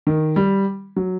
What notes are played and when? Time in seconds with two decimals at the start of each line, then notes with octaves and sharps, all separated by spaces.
0.07 D#3
0.36 G3
0.96 F#3